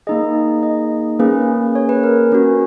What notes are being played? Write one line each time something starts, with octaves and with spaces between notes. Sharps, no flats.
A#3 D#4 G#4 D#5
D#5
A#3 C#4 G#4 B4
C#5
B4
A#4
C#4 F#4